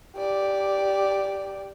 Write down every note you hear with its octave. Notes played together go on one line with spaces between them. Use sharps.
G4 D5